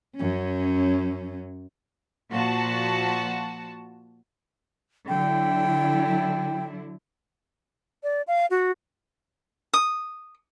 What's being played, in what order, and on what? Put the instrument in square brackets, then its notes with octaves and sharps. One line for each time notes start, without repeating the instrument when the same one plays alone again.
[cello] F#2 C#4
[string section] A#2 F3 F#4 A5
[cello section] D3 F#3 E4 [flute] G5
[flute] D5
F5
F#4
[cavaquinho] D#6